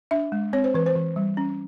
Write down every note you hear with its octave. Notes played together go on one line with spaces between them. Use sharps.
D4 E5
G#3
C4 C#5
C5
E3 B4
C5
E3
G3
C#4